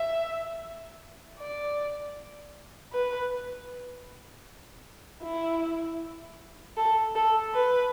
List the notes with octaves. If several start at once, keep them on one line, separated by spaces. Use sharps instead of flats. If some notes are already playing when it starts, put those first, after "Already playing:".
Already playing: E5
D5
B4
E4
A4
A4
B4